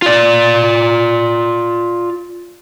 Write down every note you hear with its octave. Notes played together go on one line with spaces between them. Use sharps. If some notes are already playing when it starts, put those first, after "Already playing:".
F4 D5